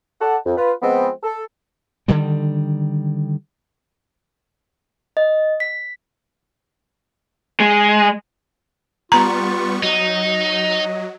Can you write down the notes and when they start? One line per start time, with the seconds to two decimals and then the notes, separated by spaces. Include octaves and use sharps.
0.21 A4 D5 F#5 A5
0.46 F2
0.58 F4 B4
0.82 F3 G#3 B3 C4
1.23 A4
2.08 D3 D#3 G3
5.17 D#5
5.60 B6
7.60 G#3
9.12 G3 B3 F4 A#5 C#6
9.83 F#3 D#4 D#5